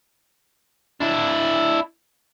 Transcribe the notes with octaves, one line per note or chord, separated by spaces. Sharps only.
D4 E4